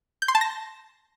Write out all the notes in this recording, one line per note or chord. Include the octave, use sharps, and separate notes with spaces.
G6
C6
A5
A#6